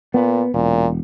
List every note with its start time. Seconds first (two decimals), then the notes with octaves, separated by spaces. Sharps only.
0.14 A#2 B3
0.54 E1 A#2